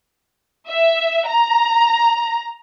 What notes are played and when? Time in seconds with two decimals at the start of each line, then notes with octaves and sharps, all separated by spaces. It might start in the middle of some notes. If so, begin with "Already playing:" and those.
0.68 E5
1.26 A#5